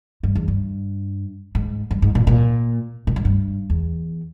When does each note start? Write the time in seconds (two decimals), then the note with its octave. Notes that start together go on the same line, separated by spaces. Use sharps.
0.23 G2
0.35 E2
0.48 G2
1.55 G#2
1.91 G2
2.02 G#2
2.15 A#2
2.27 A#2
3.07 A#2
3.16 G#2
3.25 G2
3.70 E2